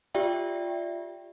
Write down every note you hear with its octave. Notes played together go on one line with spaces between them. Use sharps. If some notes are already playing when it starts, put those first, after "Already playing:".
F4 G4 D5 E5 G5